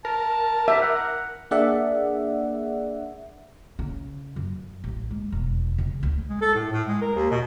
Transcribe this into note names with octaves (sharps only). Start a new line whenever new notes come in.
A#4 A5
G4 E5
F#5
A#3 D4 G#4 D5 E5 F#5
C#3
F#2
A1
G#3
E1
C#3
D2
G#3
A4
A2
A2
G#3
A#4
D#2
B2